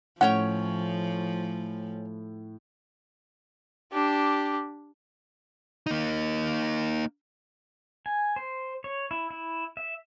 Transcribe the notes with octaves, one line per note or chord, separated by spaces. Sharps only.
A2 F3 C#4 C#5 F#5 G5
D4 G4
A#3 D#4
G#5
C5
C#5
E4
E4
E5